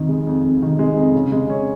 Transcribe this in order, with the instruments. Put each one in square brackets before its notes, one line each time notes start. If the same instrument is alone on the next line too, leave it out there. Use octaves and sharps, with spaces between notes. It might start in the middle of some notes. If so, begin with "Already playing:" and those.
Already playing: [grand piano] F2 D#3
G#3
F2
F2
D#3
G#3
F2
C#3
G#3
C#4